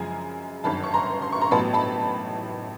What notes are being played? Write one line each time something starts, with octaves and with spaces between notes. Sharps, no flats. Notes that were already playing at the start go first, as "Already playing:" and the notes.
Already playing: F#2 C#3 F3 G#3 G#5 A#5
G1 F#2 D#3 A5 B5
C#6
A#5 C6
C6
C#6
A#5 C6
A1 A2 F#3 B3 A5 B5
A5 B5